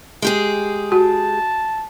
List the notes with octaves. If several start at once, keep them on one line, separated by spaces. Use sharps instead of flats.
G#3 G4 G#4
F#4 A5